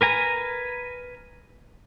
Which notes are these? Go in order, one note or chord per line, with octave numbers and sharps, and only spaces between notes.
A#4 B4 G#5 A#5